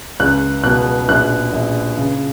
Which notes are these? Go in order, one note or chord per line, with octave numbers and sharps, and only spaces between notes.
C#2 F#6
B2 F#6
A#1 F#6
A#1
C#3